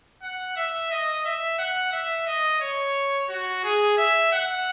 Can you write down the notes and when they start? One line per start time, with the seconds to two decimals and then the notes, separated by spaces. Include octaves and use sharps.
0.22 F#5
0.56 E5
0.91 D#5
1.25 E5
1.59 F#5
1.93 E5
2.27 D#5
2.61 C#5
3.30 F#4
3.64 G#4
3.98 E5
4.33 F#5